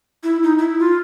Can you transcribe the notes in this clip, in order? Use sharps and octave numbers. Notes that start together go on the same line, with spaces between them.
E4
D#4
E4
F4